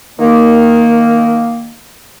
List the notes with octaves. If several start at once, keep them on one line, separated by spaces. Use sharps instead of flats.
D#3 A#3